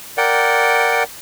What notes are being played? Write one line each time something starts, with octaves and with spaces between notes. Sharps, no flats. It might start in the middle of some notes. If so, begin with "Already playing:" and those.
A#4 D5 F#5 G5